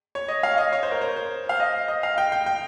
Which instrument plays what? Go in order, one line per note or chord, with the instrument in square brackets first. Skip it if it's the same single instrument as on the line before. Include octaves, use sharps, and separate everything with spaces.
[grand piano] C#5
D#5
F5
D#5
C#5
C5
A#4
C5
C5
F5
D#5
D#5
F5
G5
G5
G5